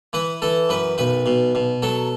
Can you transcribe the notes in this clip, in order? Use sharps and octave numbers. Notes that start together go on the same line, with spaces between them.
E3 B4
E3 A4
F#2 B4
B1 B4
B2
B2
F#3 A4